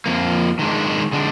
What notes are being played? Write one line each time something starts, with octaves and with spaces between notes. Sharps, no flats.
F2 F3 A#3
D#3 G#3 D4
D3 G#3 D4